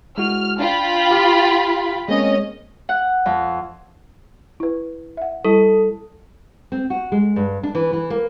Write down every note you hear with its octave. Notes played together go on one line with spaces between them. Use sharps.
G#3 E4 F#4 F6
D4 F4 G5 B5
G4 F5
G#3 A#3 C4 C#4 D#5
F#5
F2
E4 B4
E5 F#5
G3 E4 A4
C4
F#4
G#3
G2
D4
E3
E3
A#3